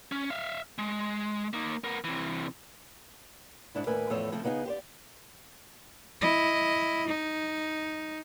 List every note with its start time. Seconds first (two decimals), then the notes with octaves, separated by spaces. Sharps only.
0.12 C#4
0.30 E5 F5
0.78 G#3
1.53 A#3 D#4
1.84 B3 A#4
2.04 C3 E3
3.75 G#2 D4 E4
3.86 D#2 A2 A#4 B4 G#5
4.10 E2 A2 F3 A4 C5 C#5
4.32 C#3 F3 A3 C4
4.44 C#3 B3 D#4 F#4 G#4
4.65 G4 C5 D5
6.21 E4 D#5
7.08 D#4